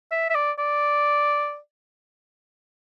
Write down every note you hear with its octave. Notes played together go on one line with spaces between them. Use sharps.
E5
E5
D5
D5